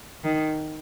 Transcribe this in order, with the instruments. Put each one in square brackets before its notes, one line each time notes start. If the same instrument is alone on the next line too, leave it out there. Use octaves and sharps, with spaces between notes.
[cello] D#3